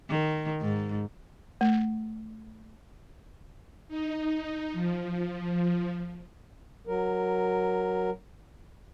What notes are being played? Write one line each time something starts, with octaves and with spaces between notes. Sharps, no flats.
D#3
G#2
A3
D#4
F3
F#3 A#4